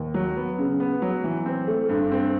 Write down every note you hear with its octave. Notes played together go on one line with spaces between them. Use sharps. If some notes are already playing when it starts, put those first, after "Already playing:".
Already playing: D#2
F#3
B3
C#3
B3
F#3
E3
C4
A3
G2
C4